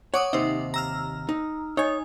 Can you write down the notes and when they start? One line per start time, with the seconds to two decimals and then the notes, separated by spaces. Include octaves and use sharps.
0.14 C#5 F#5 D6 D#6
0.33 D#2 C3 D#4 C5 E5
0.74 A#5 E6 F6
1.29 D#4
1.77 D#4 C#5 G#5